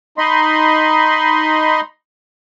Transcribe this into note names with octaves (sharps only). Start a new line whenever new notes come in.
D#4 D#5 B5 C6